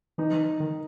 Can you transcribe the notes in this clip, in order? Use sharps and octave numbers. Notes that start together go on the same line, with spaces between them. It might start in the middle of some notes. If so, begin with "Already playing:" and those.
E3 D#4
E3
D#3